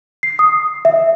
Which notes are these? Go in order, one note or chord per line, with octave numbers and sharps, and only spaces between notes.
C7
D#6
E5